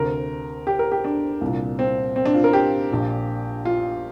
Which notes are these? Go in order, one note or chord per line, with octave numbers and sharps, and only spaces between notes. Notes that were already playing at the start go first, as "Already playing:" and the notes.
Already playing: D2 C3 A#4
G4
A#4
G4
D4
C2 A#2
C4
C4
D4
F4
A#4
G4
A#1 A#2
F4